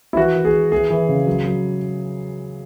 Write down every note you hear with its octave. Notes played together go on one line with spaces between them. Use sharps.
E4
E3 F#4
E3
G#4
E3
E3 G#4
E3
C#3
F#3
F#3